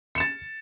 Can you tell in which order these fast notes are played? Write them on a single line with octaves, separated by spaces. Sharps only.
C#7 E7 A6